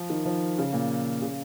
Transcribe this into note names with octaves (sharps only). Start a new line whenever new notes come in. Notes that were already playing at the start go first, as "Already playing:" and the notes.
Already playing: F3
D#3
F3
C#3
A#2
C#3